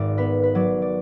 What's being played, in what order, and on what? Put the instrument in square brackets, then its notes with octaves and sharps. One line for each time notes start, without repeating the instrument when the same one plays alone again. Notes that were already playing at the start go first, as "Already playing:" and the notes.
Already playing: [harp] G#1 G#2 D5
B3 B4
B4
F#3 D5
D5